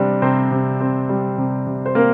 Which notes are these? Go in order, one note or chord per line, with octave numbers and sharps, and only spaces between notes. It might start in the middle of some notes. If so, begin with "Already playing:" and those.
Already playing: C3 G3 C4 D4
C3 C4 C5
C3
C4
G3
C3
C3
C5
A#3 C4 A#4